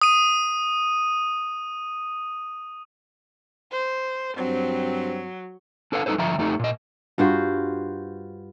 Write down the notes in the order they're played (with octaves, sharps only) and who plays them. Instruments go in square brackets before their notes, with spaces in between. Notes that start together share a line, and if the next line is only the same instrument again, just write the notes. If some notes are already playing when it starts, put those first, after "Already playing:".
[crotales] D#6 D#7
[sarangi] C5
[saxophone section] G2 C4 [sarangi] F#3
[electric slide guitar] D4 A4 B4 D5 F5
G3 A3 D#4 A4 B4 C5
D3 F3 E5 A#5
F2 A3 D#4 G4 A4
A#2 D#5
[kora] G2 F4 F#4 C5